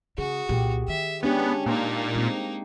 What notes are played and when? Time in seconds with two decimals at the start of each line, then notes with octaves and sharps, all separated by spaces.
0.18 C#3 F#4 G#4
0.49 C2 A#2 G4
0.88 D#3 E5
1.23 G#3 B3 C#4 D4 G4
1.66 A#2 A#3 D#4
2.15 G3 G#3 C4